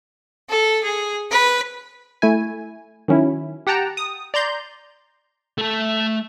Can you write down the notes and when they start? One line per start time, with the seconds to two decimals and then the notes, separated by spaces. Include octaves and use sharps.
0.49 A4
0.82 G#4
1.30 B4
2.22 A3 E4 G#5
3.08 D#3 F#3 C#4 E4
3.67 G4 F#5 G5 A5 A#5
3.97 D#6
4.34 D5 A#5 C6 G6
5.58 A3 A4